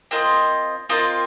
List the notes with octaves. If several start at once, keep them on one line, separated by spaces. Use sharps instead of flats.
C4 F4 A#4 D#5
C4 F4 A#4 D#5